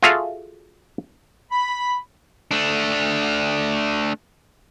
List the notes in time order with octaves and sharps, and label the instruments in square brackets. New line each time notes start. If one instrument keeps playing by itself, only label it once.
[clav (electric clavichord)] F4 F#4 G#4 A4 E5 F5
[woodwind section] B5
[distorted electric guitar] A3 D4